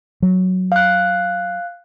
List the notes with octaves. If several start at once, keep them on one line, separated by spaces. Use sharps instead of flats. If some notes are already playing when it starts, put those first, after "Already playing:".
F#3
F5 F#6